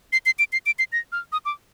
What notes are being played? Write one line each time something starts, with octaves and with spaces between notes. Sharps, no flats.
C7
C7
D7
C7
D7
C7
A#6
F6
D#6
D6